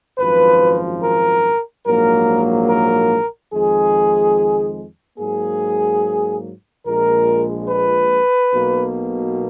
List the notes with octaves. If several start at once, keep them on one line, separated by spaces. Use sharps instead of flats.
G#1 F#2 F3 B4
A#4
A#1 G#2 F#3 A#3 A#4
A#4
F2 D#3 G#3 G#4
G#2 F#3 A#3 G#4
A#1 A#2 G#3 A#4
B4
B1 B2 A#3